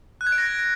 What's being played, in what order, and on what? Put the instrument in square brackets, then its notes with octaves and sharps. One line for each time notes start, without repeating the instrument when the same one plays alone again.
[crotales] F#6
G#6
D7
A#6